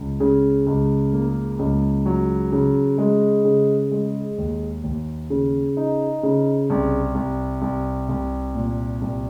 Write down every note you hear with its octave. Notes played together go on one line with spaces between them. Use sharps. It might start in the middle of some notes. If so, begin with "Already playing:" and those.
Already playing: C#2
C#3
C#2
A#3
C#2
F#3
C#3
G#3
C#3
G#3
D#2
D#2
C#3
D#4
C#3
C2
C2
C2
C2
A#2
C2